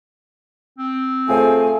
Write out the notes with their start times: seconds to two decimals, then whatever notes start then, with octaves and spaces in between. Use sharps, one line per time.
0.78 C4
1.28 A3 F4 G#4 C5 G#5